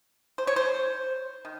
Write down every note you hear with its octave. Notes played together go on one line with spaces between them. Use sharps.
C5
C#5
C5
D#3